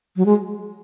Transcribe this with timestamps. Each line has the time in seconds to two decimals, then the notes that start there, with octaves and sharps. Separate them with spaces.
0.17 F#3
0.26 G#3